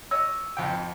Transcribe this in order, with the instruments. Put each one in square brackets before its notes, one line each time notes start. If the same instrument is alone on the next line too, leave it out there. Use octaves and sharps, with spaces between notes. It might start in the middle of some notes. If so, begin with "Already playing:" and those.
[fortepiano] C#5 D#5 [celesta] E6
[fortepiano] G#1 F2 G5